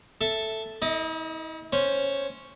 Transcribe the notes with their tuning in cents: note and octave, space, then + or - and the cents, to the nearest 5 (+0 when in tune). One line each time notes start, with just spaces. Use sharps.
A4 +0 E5 +0
E4 -45 D#5 +0
C#4 +0 C5 +10